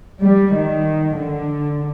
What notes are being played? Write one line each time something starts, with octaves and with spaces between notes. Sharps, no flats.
G3
D#3
D3